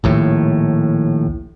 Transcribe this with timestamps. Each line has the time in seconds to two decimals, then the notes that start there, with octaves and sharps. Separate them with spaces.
0.04 A#1 D#2 A2